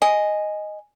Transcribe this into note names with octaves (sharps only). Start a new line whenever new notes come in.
D#5 G#5